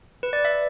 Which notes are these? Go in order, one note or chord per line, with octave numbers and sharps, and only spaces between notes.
B4
D5
E5